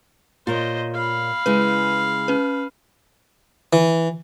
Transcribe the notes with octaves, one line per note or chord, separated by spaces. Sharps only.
A#2 F4 A#4 C5 C#5 D#5
F5 B5
C#3 G#3 E4 B4
C#4 B4
E3